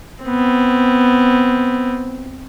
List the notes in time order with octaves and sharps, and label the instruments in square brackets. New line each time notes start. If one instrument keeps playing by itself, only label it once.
[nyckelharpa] B3 C4